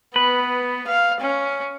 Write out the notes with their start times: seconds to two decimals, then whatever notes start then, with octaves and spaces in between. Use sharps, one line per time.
0.16 B3 B4
0.87 F5
1.21 C#4